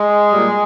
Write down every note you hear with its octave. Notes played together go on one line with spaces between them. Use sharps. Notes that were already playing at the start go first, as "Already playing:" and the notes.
Already playing: G#3
A#2 G3